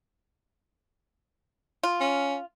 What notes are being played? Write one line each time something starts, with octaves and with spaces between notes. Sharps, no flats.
F4
C#4